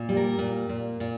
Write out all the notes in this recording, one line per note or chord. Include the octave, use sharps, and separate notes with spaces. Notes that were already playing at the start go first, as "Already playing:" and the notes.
Already playing: A#2
G3
A#4
A#2
A#2
A#2